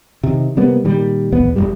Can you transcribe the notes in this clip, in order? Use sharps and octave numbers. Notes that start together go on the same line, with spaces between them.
C3 D#3
C3 G3 A#3 B3
A#2 D#3 G3
D1 A#1 E2 B3
F1 C#2 G2 G3